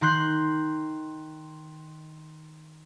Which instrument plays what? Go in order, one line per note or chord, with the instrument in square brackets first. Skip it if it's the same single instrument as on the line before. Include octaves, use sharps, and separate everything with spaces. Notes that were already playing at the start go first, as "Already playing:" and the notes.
[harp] D#3 A#5 C6 F#6 G6 C7